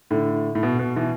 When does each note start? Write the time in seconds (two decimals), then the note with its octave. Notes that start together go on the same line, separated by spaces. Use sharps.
0.11 A2 D3
0.55 A2
0.63 B2
0.79 B2
0.96 B2 E3